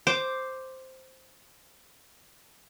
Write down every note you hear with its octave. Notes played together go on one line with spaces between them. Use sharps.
C5 D6